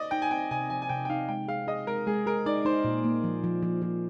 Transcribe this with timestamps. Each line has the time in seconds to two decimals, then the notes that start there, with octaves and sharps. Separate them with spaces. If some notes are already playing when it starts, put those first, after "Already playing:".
Already playing: D5 D#5
0.11 D#4 G5
0.22 G#5
0.31 C4 G5
0.51 C3 G#5
0.70 F3 G#5
0.82 G#5
0.89 C3 G5
1.05 G5
1.10 D#4 F5
1.29 G#3 G5
1.48 G#4 F5
1.67 G#4 D#5
1.87 G#3 A#4
2.07 G#3 G#4
2.26 G#4 A#4
2.46 D#4 D5
2.65 D#4 C5
2.84 A#2
3.05 A#3
3.24 F3
3.44 F3
3.63 F3
3.82 F3